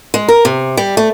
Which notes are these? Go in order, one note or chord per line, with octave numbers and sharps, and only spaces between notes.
G#3
A#4
C3
G3
A3